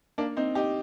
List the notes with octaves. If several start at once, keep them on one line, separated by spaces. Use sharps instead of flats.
A#3 D4
C4 D#4
D#4 G4